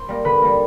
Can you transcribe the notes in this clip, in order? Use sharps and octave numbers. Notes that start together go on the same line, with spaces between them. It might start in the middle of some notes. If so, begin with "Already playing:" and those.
Already playing: C5 C6
G3 A#3
D3 B4 B5
G3 A#3